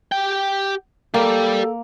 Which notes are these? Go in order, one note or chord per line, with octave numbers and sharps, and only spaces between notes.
G4 G5
A#3 G4 A4 D5